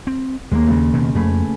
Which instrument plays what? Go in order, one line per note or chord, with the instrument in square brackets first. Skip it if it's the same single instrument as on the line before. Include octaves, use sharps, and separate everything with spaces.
[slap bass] C4
[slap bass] D#2 [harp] G#3 A#3
[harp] C#3 G#3
[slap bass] B2 D#3
[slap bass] F2 [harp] A3 G#4 B4